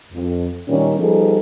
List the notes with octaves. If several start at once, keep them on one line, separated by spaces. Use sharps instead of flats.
F2
A#2 D#3 G3 C#4
F3 G3 B3 D#4 G#4 A4